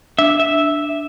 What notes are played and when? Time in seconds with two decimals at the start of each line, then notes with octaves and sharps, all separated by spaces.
0.19 D4 E5
0.40 E5